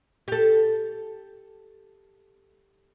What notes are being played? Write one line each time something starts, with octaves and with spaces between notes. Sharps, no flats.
G4 A4